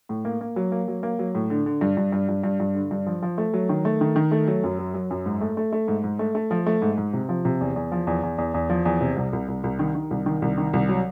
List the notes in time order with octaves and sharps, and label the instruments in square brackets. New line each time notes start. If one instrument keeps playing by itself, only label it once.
[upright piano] A2
A#3
A#3
F#3
A#3
F#3
A#3
F#3
A2
D3
D3
G2
G2
G2
G2
G2
G2
D3
G2
F3
F3
A3
F#3
D#3
A3
D#3
D#3
A3
F#3
F#2
F#3
F#3
F#2
G#2
A3
A3
A3
G#2
G#2
A3
A3
F3
A3
G#2
G#2
C3
F3
C3
E2
E2
F3
E2
E2
E2
E2
F3
E2
C3
C2
C2
C2
C2
D#3
D#3
C2
D#3
C2
D#3
C2
F#3